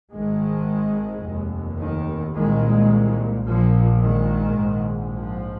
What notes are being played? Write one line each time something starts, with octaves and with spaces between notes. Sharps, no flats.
G#1 G#2 D#3 G#3
F1 D#2
D#3
C2 A#2 D#3 G#3
A#1 A#2 F3 A#3
D#3 G#3
A#1 G#2
F3